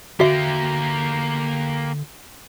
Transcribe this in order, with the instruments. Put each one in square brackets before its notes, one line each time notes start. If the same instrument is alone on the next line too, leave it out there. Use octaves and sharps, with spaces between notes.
[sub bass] D3 [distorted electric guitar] A#3 G4 [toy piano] F#4 E5